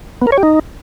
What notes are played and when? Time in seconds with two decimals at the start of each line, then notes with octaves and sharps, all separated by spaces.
0.22 B3
0.27 A#4
0.32 C#5
0.38 G4
0.43 D#4